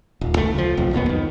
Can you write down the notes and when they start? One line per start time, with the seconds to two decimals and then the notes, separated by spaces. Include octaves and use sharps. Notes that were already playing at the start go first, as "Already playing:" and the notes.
0.21 D#1
0.37 C#2 A3
0.55 C#2 F3
0.77 F1 B1 F2
0.93 D1 D#2 B2 B3
1.09 F2 D#3